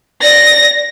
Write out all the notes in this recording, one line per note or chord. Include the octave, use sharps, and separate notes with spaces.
D5 A#6